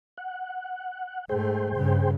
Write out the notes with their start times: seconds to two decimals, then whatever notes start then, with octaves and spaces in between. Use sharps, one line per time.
0.18 F#5
1.29 G#2 A3 G#4 C5 G5
1.75 G2 C#3